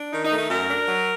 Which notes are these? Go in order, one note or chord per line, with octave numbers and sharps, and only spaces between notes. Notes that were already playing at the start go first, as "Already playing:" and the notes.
Already playing: D4
D#3 D#4
D#4
A3
D#4
F#2 A#4
D4
F#3